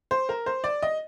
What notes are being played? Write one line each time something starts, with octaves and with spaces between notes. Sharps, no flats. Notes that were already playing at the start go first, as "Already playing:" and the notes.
C5
A#4
C5
D5
D#5